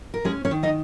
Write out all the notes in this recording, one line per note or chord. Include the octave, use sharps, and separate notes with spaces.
A#4
G#3 C#4 G#4
C#4 C#5
D#3
D#4 D#5